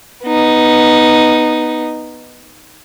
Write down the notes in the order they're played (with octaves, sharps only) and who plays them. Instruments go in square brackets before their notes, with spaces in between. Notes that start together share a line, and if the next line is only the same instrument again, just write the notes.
[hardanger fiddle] B3 D#4